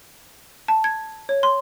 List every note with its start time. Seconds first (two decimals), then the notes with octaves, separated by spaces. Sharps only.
0.68 A5
0.84 G#6
1.29 C#5
1.43 C6